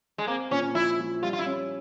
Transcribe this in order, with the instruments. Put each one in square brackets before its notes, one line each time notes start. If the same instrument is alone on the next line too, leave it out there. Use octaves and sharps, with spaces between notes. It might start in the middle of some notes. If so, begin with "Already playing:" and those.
[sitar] G#3
[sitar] A#3 [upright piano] C4
[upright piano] A#2 [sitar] C#4
[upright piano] F3 [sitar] E4
[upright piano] F3
[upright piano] G3 [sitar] F4
[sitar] F4
E4
[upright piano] C#4